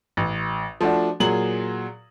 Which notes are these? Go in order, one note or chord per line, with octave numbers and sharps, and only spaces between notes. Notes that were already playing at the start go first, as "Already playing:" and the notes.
A1
F3 A3 D4 F#4
A#2 F#3 G#4 F#7